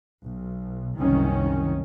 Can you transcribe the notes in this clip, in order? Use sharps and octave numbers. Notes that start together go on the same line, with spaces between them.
B1
F#1 C2 D#3 C#4